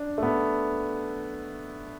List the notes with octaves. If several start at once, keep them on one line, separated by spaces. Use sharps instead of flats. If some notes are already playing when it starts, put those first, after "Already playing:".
Already playing: D4
A3
B3